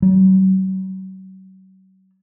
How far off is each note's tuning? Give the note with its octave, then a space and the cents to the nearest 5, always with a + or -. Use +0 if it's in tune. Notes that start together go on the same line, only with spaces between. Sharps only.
F#3 +40